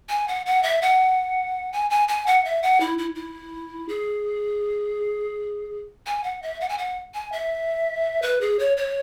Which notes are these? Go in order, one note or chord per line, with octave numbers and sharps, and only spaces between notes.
G#5
F#5
F#5
E5
F#5
G#5
G#5
G#5
F#5
E5
F#5
E4
E4
E4
G#4
G#5
F#5
E5
F#5
G#5
F#5
G#5
E5
B4
G#4
C#5
C#5